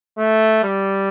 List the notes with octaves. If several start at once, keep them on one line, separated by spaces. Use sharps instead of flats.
A3
G3